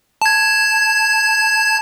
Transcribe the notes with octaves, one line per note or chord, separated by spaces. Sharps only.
A5 G#6